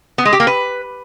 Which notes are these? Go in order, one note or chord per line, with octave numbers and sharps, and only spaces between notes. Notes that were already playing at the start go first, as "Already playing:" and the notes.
B3
G#3
G4
A#3
B4